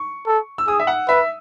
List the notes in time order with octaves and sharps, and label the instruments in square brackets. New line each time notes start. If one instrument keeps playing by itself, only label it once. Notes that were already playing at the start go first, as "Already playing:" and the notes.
Already playing: [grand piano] C#6
[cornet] A4
[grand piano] E6
[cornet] G#4 [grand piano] D#6
[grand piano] E5
F#5
[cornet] B4 [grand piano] E5